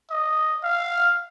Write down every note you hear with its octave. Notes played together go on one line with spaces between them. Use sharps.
D#5
F5